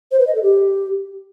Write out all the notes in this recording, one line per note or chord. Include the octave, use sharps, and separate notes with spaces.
C5
B4
D#5
A4
G4